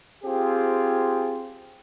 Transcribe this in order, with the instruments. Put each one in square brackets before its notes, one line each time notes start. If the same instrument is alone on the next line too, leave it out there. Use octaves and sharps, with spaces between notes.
[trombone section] C4 F4 G4 G#4